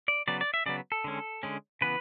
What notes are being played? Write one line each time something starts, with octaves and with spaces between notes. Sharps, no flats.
D5
C#3 F#3 B3 D5
D5
E5
C#3 F#3 B3 D5
A4
D3 G#3 C#4
D3 G#3 C#4
C#3 E3 B3 B4